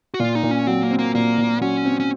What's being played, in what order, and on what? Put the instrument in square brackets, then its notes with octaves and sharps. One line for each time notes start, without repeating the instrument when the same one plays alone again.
[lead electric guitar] F#4
[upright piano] A#2 [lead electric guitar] F4
[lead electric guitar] D#4
[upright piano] A#2
[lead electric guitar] C#4
[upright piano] F#3 [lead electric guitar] C4
[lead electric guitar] A#3
[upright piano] C4
[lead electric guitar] A#3
[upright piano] A#2 [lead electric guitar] A#3
[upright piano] A#2
[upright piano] F#3 [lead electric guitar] C#4
[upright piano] C4
[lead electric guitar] C#4